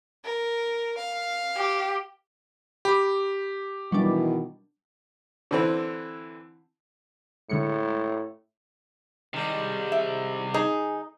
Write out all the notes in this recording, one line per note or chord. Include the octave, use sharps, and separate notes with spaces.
A#4
F5
G4
G4 B5 D6
B2 D#3 E3 F#3 G3 D4
D3 E3 C4
A2 D3 G#3 C#7
C3 D#3 G3 G#3
E5
D#4 G#4